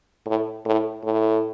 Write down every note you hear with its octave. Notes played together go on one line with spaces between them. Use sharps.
A2
A2
A2